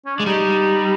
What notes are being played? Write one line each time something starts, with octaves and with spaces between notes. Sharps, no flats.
C#4
G#3 D4
G3 D#4